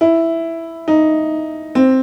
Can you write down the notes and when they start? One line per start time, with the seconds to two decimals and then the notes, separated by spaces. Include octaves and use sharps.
0.01 E4
0.88 D#4
1.75 C4